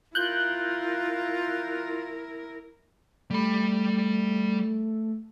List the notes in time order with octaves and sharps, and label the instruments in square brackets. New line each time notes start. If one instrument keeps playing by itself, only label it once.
[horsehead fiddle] E4 A#4 [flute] F4 [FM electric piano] F#6 G6
[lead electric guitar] G3 B5 [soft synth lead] A3